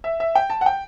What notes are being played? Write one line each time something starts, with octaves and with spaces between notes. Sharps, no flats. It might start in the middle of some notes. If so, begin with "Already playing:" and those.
E5
E5
G5
A5
F#5
G5